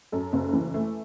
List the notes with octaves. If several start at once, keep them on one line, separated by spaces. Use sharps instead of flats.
F#2 A4
F#1
E3
A3